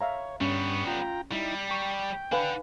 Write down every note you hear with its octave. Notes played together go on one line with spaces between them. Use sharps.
C#5 E5 F5 A#5
G2 G3 B3 C#4 C#6
F4 G5 A#5
G3 D#4 E4
G5 A#5 C#6
D4 B4 F5 F#5 G#5